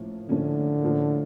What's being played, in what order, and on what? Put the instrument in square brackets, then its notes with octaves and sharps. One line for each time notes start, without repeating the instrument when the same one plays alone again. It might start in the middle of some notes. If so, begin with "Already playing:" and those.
Already playing: [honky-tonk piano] A2 F3 A#3 C#4
[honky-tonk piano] A2 F3 A#3 C#4 [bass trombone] D3
[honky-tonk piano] A2 F3 A#3